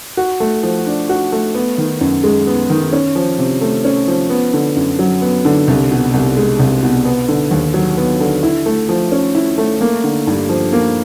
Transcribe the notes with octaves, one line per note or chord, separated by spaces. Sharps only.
F#4
A3
F3
D4
F#4
A3
B3
D#3
F#2
G#3
B3
D#3
C#4
F3
C3
A3
C#4
F3
B3
D3
F#2
F#3
B3
D3
C2
B2
C2
G#3
C2
B2
B3
D3
D#2
F#3
B3
D3
E4
A3
F3
C#4
E4
A3
A#3
D3
G2
F3
A#3